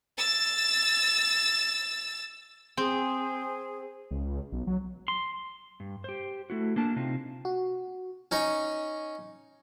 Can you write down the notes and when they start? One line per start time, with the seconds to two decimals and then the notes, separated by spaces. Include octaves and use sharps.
0.18 E6 A6
2.77 C4 G#4
4.11 C#2
4.52 B1
4.67 F#3
5.08 C6
5.80 G2
6.04 G4 C5
6.50 A3 E4 F#4
6.76 A#3 D4 A5
6.96 C3 C4 D#4 F4
7.45 F#4
8.31 C#4 D#4 C#5